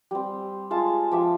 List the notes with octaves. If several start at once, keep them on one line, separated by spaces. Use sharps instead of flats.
G3 C4
G#3 F4 A5
F3 G4 E5